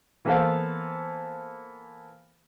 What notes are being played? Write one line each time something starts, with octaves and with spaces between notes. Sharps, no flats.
E3 A#3 B3 A4 C5 F5